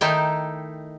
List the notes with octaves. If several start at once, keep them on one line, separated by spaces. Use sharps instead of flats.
D#3 A3 D#4 E4 G5